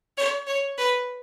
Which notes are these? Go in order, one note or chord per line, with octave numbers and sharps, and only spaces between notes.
C#5
C#5
B4